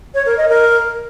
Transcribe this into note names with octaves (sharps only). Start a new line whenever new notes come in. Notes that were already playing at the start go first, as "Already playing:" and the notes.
C#5
A#4
D#5
A#4